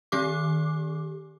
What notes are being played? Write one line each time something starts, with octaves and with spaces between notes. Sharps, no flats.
D#3 G4 D6